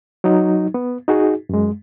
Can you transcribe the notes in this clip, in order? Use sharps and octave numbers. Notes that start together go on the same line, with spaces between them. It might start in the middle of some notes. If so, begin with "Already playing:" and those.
F#3 D#4
B3
D#4 F#4 G#4
F#2 G#3